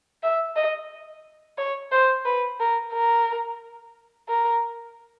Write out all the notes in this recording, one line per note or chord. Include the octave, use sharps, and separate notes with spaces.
E5
D#5
C#5
C5
B4
A#4
A#4
A#4